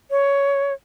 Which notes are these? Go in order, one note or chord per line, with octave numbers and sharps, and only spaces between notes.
C#5